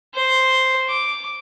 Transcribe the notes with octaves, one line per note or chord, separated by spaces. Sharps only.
C5
D6